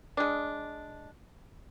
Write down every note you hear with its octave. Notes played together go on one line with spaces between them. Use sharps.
G#3 D4